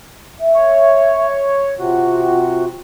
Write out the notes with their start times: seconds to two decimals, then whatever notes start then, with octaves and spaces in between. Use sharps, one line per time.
0.40 E5
0.55 C#5
1.79 C3 F4 F#4